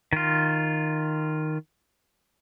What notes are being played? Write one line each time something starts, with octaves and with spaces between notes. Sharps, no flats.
D#3 F4